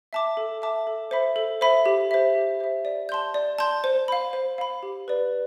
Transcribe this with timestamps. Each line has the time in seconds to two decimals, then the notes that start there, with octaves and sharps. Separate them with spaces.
0.13 E5 A5 D6
0.37 A4
0.62 E5 A5 D6
0.87 A4
1.11 C5 E5 B5
1.36 A4
1.61 C5 E5 B5
1.86 G4
2.11 C5 E5
2.35 G4
2.60 C5 E5
2.85 D5
3.09 A5 C6 G6
3.34 D5
3.59 A5 C6 G6
3.84 C5
4.08 F5 B5
4.33 C5
4.58 F5 B5
4.83 G4
5.08 B4 D5